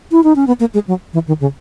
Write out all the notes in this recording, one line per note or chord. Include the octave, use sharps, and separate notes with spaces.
E4
D#4
C#4
B3
A#3
G#3
F#3
E3
D#3
C#3